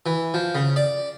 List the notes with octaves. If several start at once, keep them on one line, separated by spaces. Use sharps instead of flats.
E3
F3
C#3
D5